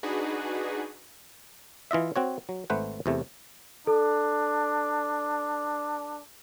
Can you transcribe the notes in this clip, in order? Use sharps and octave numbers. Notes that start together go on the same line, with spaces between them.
D4 D#4 F#4 G#4 B4
E3 F4 D#5 E5
C4 F#4 C#5
F#3
G#1 A3 B4 C5 F#5
E2 C3 A3
D4 A4